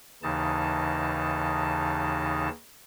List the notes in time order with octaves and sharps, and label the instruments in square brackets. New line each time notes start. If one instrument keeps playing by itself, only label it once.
[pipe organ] D#2 C#3 E3 D#4 A5